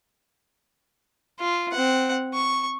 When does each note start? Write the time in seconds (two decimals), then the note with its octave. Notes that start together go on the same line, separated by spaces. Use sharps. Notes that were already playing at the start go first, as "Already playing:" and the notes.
1.40 F4
1.72 C4 F#5
2.34 C#6